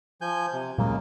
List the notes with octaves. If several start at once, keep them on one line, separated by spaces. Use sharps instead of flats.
F3 G#5 G6
C3
A#2 C#3 F#3 G#3 A#3